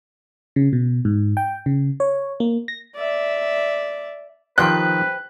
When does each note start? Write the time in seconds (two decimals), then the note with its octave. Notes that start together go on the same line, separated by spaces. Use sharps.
0.56 C#3
0.73 B2
1.05 G#2
1.37 G5
1.66 C#3
2.00 C#5
2.40 A#3
2.68 A#6
2.97 D5 E5
4.58 D#3 F3 C4 G4 B4 C5 G5 F#6